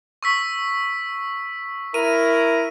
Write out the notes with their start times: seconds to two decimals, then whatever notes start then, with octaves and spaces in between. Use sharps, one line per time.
0.23 C#6 E6 B6
1.94 E4 A#4 D#7